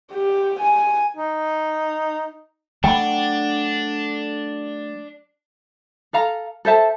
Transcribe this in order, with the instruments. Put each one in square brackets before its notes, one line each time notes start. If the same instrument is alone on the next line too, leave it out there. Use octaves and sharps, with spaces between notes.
[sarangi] G4
G#5
[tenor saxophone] D#4
[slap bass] F#3 A3 [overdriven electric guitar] D4 [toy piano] G5 B5
[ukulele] A4 F5 A#5
A4 C5 E5 A5